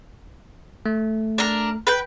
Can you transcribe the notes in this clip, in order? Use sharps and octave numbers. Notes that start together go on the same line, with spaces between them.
A3
D4 A#4
B4 G5